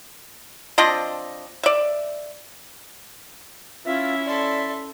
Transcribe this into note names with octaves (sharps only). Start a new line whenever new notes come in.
F3 C4 D4 D#5
D5 E5
C#4 E4 F4 E5
A4 D5 C6